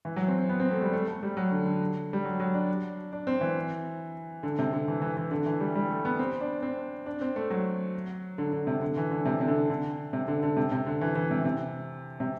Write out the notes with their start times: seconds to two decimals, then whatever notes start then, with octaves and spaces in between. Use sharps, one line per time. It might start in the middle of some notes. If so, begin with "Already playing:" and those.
0.05 E3
0.16 F#3
0.28 C4
0.38 C4
0.49 B3
0.60 C4
0.71 A3
0.82 G3
0.93 A3
1.08 A3
1.23 G3
1.37 F#3
1.51 D3
1.66 D3
2.13 G3
2.25 F#3
2.40 F#3
2.54 D4
3.12 D4
3.27 C4
3.41 E3
4.43 D3
4.59 C3
4.73 D3
4.88 E3
5.02 E3
5.17 E3
5.31 D3
5.46 E3
5.60 G3
5.75 G3
5.90 A3
6.05 B3
6.19 C4
6.41 D4
6.62 C4
7.06 D4
7.21 C4
7.36 A3
7.50 F#3
8.38 D3
8.53 D3
8.67 C3
8.82 D3
8.97 E3
9.11 D3
9.25 C3
9.41 C3
9.48 D3
9.70 D3
10.13 C3
10.28 D3
10.43 D3
10.57 C3
10.72 C3
10.86 D3
11.01 E3
11.15 E3
11.31 C3
11.45 C3
12.20 C3